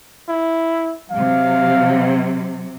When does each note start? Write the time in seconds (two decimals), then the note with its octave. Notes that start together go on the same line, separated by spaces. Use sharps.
0.29 E4
1.11 C3 F#3 F5